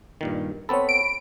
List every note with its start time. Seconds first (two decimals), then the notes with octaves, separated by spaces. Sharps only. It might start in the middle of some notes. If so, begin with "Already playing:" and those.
0.21 G2 A#2 D#3
0.69 B3 C4 A4 C#5 B5
0.89 D7